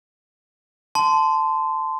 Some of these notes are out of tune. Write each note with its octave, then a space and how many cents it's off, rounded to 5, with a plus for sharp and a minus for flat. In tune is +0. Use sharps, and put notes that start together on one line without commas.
A5 +0 C6 -20